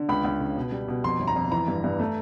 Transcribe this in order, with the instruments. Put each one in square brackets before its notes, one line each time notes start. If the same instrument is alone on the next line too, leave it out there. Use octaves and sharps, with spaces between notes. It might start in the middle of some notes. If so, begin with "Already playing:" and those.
Already playing: [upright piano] D3
C#2 B5
C#2
C#3
B2
G3
B2
F2 C6
G1
A#5
F2
E3 A#5
G2
G2
A3